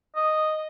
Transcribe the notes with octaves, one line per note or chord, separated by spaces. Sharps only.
D#5